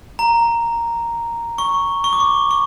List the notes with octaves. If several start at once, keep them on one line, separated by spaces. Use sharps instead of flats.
A#5
C#6
C#6
D6
C#6
C#6